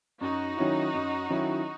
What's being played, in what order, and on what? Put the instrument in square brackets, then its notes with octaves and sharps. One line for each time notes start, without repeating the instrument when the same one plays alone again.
[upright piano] F#2 [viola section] D#4 F#4
[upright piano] D#3 F#3 C#4 E4
F#2
D#3 F#3 C#4 E4